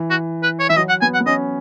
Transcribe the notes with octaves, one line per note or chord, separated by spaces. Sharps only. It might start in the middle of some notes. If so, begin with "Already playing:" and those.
Already playing: E3
F#4
B4
C#5
E3 E5
F#3 D#5
F#5
B3 G#5
F#5
B3
C#4 D#5